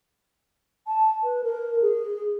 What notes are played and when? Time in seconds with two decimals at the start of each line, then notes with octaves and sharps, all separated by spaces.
0.87 A5
1.23 B4
1.44 A#4
1.82 G#4